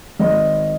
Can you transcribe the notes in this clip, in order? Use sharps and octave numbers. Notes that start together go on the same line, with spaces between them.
G#1 D#5